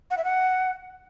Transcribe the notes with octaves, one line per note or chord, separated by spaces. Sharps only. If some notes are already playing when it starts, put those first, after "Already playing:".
F#5
E5
F#5